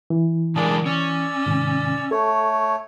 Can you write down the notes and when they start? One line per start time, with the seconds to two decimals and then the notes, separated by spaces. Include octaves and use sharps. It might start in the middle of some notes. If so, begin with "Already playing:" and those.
0.10 E3
0.56 C#3 G#3 D4 G#4 A#4 A5
0.86 C#4 D5 E6
1.46 G#2 C3 D#3
2.11 A3 A4 C#5